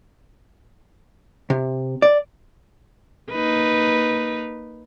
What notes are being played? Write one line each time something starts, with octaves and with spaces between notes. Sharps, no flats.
C3
D5
A#3 D#4 B4